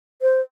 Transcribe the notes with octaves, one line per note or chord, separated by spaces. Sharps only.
C5